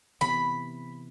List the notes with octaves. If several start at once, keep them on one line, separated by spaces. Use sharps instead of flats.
C3 E3 B3 B5